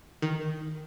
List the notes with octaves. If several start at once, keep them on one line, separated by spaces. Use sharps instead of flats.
D#3